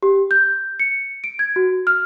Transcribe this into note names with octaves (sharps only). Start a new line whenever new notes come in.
G4
G6
C#7
D7
G#6
F#4
F6